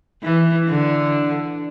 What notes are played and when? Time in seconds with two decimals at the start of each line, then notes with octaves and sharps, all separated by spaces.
0.23 E3
0.69 D3